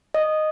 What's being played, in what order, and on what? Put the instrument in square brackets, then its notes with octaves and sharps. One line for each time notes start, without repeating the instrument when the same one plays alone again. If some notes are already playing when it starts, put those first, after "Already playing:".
[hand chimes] D#5